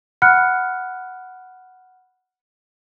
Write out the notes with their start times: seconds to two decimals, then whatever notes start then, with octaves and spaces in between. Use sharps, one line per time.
0.22 F#5 B5 F6 F#6 C#7